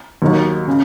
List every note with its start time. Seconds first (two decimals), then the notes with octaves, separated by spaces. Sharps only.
0.22 D#2 D#3 F#3
0.67 C#3